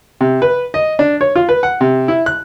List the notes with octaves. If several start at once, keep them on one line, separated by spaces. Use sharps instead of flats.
C3
B4
D#5
D4
C#5
F4
B4
F#5
C3
E4
F#6